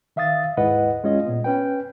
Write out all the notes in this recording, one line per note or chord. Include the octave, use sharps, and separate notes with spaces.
D#3 E5 F5 D#6 A6
D#2 G#2 E4 B4 D#5 F#5
G#3 C#4 F4 D#5
A#2 B3
C#4 B4 G5